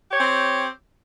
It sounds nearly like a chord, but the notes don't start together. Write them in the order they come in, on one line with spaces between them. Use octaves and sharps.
G4 C#5 C4